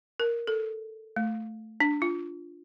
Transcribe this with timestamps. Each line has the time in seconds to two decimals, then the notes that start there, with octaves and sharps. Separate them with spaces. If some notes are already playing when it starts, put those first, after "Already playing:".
0.20 A#4
0.47 A4
1.16 A3
1.80 D4
2.02 F4